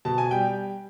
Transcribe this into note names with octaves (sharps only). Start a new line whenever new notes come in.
B2 A5
G#5
G3 G5